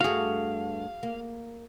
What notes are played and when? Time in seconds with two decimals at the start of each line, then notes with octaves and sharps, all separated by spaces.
0.01 G2 A3 F#4 G#4 F5
1.03 A#3